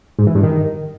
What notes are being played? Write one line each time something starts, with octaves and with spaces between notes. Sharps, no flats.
G#2
E3
G2
D#3